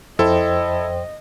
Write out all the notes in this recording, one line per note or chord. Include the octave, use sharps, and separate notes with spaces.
F2 E4 A4 C5 D#5 G5